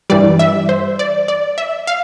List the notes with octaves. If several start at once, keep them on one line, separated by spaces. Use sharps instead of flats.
G2 E3 G3 D5
E5
C5
D5
D5
E5
F5